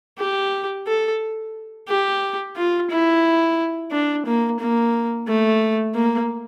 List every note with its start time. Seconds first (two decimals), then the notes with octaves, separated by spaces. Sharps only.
0.18 G4
0.87 A4
1.88 G4
2.56 F4
2.90 E4
3.92 D4
4.26 A#3
4.59 A#3
5.27 A3
5.95 A#3